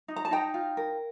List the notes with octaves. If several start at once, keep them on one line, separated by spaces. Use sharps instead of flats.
D#4
A#5
A5
D#4 G5 A#5
F4
A#4